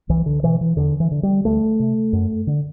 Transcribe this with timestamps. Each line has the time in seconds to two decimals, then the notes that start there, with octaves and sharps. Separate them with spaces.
0.09 C2 E3
0.26 D3
0.43 B2 E3
0.61 E3
0.77 E2 D3
1.00 E3
1.12 D3
1.23 G3
1.45 D2 A3
1.80 C3
2.13 F#2
2.47 D3